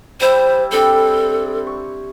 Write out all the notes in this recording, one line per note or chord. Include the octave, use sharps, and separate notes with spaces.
G3 E4 C5
C4 D4 G4 A4
C#6